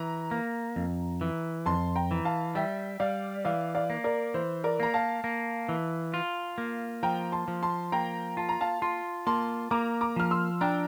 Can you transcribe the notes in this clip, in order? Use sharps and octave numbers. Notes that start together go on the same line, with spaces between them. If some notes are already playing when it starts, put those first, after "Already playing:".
Already playing: E3 A#5
A#3
F2
E3
F2 A5 C6
G5 A#5
E3
F5 A5
G3 E5 G5
G3 D5 F5
E3 D5 F5
D5 F5
A#3
A#4 D5
E3 C5
A#4 D5
A#3 A#5
F5 A5
A#3
E3
F4
A#3
F3 G5 A#5
A5 C6
F3
A5 C6
A#3 G5 A#5
F4 A5
A#5
F5 A5
F4 A5 C6
A#3 A5 C6
A#3 A#5 D6
A#5 D6
F3 F6
C6 E6
D4 G5 A#5